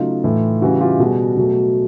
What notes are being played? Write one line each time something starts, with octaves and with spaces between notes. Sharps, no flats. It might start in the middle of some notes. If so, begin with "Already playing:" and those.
Already playing: C#3 F#3 A3 D#4 F4
A2 E3 A3
C#3 E3 G3 E4 F#4
F4 G4
B2 G3 F#4 G#4
B2 F#3 A3